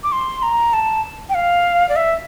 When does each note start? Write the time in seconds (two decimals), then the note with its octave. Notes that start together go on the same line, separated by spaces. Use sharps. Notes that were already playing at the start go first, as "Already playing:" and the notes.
0.03 D6
0.12 C6
0.43 A#5
0.73 A5
1.29 G5
1.35 F5
1.89 D5
1.96 E5